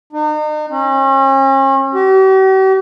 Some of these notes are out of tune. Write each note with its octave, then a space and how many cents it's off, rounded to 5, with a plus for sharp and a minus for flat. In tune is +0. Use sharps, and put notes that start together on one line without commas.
D#4 -40
C#4 -40
G4 -45